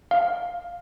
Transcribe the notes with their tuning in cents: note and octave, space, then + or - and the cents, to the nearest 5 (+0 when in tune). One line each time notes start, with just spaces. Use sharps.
F5 +10